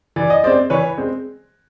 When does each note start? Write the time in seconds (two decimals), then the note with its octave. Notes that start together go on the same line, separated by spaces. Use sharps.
0.16 E3 D5
0.30 D#5
0.43 G#3 C5 D5
0.47 C4
0.70 E3 B4 C#5
0.97 G#3 C4